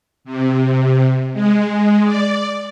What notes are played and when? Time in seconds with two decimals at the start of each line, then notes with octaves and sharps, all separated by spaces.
0.25 C3
1.33 G#3
2.05 D5